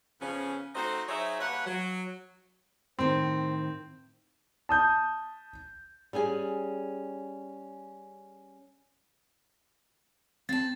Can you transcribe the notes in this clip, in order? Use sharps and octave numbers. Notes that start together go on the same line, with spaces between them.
F2 C#3 F3 B3 C#4
A3 D#4 F#4 A4 C5
F#3 D#4 G#4 C5 C#5 E5
G2 A#3 B4 C#5 F#5
F#3
A2 D#3 C4 C5
A5 D#6 G6
G3 C#4 G#4 G#5
C4 A5 A6